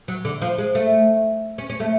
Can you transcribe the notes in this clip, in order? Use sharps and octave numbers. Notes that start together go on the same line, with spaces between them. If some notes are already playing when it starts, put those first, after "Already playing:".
F#3
D3
F3
G#3
A3
C#4
C#4
A3